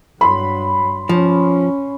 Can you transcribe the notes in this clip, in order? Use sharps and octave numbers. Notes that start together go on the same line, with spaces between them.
G2 F#3 B5 C6
F3 C#4